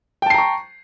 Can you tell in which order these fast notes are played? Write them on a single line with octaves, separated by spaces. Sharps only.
G5 A5 C7 A#5 C#6